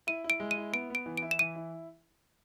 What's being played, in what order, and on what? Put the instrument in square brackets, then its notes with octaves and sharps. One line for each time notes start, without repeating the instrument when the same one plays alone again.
[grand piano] E4 [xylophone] D#7
[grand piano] E4
[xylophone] D7
[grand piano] G#3
[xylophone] D#7
[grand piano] E4
[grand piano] B3 [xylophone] D7
[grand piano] B3 [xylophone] D7
[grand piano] E3
[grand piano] E4 [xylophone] D7
[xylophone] E7
[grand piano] E3 [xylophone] D#7
[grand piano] E4